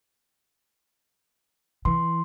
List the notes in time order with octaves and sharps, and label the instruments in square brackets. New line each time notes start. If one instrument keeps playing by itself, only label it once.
[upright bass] E3 [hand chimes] C6